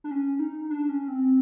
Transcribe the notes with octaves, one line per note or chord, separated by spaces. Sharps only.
D4
C#4
D#4
D4
C#4
C4